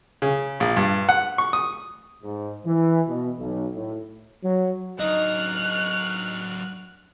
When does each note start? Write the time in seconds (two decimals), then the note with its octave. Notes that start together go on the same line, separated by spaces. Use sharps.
0.22 C#3
0.60 A#1
0.77 G2
1.09 F#5
1.38 C#6
1.53 D#6
2.23 G#2
2.66 E3
3.08 B2
3.38 B1
3.75 A2
4.43 F#3
5.00 F#3 D4 D#4 F6 F#6